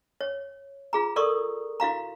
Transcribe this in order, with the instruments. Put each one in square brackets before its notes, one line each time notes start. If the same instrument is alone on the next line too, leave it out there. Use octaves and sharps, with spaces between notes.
[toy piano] C#5
F4 G#4 A#5
A4 A#4 D5 C6 C#6 D#6
E4 F#4 F5 A#5